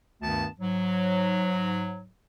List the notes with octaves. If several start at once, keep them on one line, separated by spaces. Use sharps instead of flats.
D2 G2 D#3 B3 A5
G#2 F#3